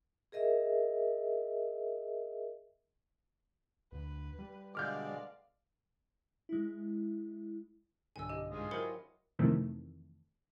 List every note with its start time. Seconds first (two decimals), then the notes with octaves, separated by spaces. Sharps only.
0.32 G#4 A#4 D#5 E5
3.92 D2 B4
4.39 G3
4.75 B2 D3 G#3 D5 F5 D6 F6 G6
6.49 G#3 E4
8.16 B1 G2 D3 G#5 E6
8.29 G4 D#5 D#7
8.51 G#2 F4 D#5 G#5
8.71 F#3 E4 G4 A#4 C5 B5 C#7
9.39 F2 C3 D#3 E3 A3